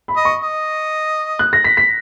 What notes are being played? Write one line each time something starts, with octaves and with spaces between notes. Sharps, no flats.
B5
D#5
C#6
D#5
F#6
A#6
B6
B6